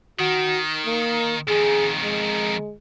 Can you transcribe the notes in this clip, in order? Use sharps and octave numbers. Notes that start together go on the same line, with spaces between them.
D#3 F#4
A#3
F2 D#3 G#4
G#3